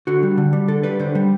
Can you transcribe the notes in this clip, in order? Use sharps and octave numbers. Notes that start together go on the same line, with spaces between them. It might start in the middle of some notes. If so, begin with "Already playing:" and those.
D3 F#4
G3
D3
G3
D3 A4
G3 B4
D3 C5
G3